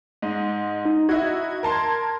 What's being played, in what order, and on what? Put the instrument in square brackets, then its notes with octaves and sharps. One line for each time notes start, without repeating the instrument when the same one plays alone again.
[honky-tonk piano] G#2 [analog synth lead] D#5
[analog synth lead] D#4
[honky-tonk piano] D#4 E4 F#4 [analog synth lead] G#6
[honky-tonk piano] A#4 A5 C6